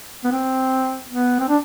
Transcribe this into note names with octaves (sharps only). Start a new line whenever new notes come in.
B3
C4
B3
C4
D4